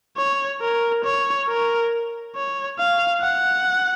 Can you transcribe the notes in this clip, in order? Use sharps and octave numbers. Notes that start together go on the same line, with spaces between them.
C#5
A#4
C#5
A#4
C#5
F5
F#5